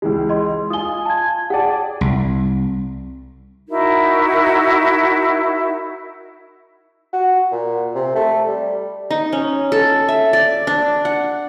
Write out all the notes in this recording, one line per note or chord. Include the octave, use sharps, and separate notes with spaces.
C#2 E3 G#3
D#5 C6
F4 G#5 D#6 G7
A5 G#6
G#4 D5 F#5 G5 A5
C2
D#4 E4 F#4 A#4
F#4
A#2
C3
A3
G3
D#4
C#4
A4
E5
D5
D4
F#5